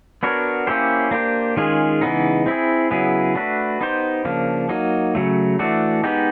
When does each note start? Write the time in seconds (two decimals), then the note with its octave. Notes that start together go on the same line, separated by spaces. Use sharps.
0.23 B3 D4 F#4 A#4 C#5
0.67 A#3 C#4 E4 G4 C5
1.11 A#3 D4 G4 C5
1.57 D#3 G#3 C#4 F4 G#4
2.01 C#3 E3 G#3 B3 D#4
2.46 C4 E4 G#4
2.91 C#3 F#3 B3 E4 G#4
3.35 A3 D4 F#4 B4
3.81 B3 D#4 G4 C5
4.25 C#3 F3 A#3 D4
4.69 F#3 A#3 D#4
5.15 C#3 F#3 A3
5.59 E3 A3 D4 F#4
6.04 G#3 B3 D#4 G4